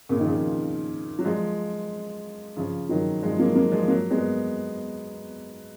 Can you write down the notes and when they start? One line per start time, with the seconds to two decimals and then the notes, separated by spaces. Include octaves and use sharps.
0.09 A#2 C#3
0.19 D#3
0.25 C#3 F3
1.19 F#3
1.25 F3 G#3
2.57 C#3 F3
2.89 D#3 F#3
3.22 F3 G#3
3.39 F#3 A#3
3.55 F#3 A#3
3.71 F3 G#3
3.88 F#3 A#3
4.10 G#3 B3